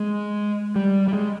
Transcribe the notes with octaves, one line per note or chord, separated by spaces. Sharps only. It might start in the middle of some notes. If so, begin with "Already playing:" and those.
Already playing: G#3
G3
G3
G#3